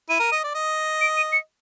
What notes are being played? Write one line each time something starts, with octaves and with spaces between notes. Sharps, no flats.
E4 D#7
A#4
D#5
D5
D#5
D7
D#7
C#7